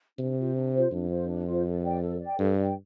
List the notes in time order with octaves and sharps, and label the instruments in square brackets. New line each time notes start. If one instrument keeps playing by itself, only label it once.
[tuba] C3 [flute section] D4
[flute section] F4 C5
D4
F4 C5
[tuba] F2 [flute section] D4
[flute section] F4 C5
D4
F4 C5
A4
D5 G5
A4
D5 G5
[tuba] G2 [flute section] A4
[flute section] D5 G5